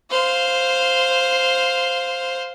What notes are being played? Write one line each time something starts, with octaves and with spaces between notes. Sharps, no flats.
C5 F5